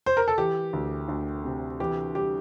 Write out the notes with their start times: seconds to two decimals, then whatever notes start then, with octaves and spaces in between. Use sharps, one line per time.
0.06 C5
0.17 A#4
0.28 A4
0.38 E3 G4
0.73 D2
1.09 D2
1.44 C3
1.80 E3 G4
2.15 G3 G4